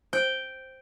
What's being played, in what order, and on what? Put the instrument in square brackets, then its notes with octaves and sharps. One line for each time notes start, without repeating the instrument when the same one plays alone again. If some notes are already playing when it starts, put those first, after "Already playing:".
[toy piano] C5 [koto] G5